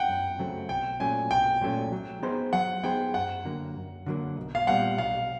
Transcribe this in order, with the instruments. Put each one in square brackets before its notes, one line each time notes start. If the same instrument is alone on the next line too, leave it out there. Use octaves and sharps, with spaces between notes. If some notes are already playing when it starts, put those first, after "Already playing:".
Already playing: [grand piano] F#5 G5
[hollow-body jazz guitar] F#2
C#3 F#3 A3 C4
[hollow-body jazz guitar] B1 [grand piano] G5
[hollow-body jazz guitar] A#2 F#3 A3 C#4 [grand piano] G#5
[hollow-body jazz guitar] B1 [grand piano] G5
[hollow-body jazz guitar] A#2 F#3 A3 C#4
F#3
B3 D#4 G#4 C5
[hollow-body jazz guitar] F#3 [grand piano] F#5
[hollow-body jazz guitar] B3 D#4 G#4 C5 [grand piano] G5
[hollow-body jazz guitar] F#2 [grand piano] F#5
[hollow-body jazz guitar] D3 F#3 A#3
F#2
D3 F#3 A#3
B1
[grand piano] F5
[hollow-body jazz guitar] A#2 G3 B3 [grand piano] F#5
[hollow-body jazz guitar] B1 [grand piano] F5